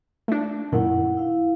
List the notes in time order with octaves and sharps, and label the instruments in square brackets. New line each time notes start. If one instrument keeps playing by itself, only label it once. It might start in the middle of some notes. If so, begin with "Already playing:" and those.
[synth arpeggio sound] A3 D4
[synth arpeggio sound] F#2 A#2 D#3 [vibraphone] E4 F#5
[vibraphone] E4 F5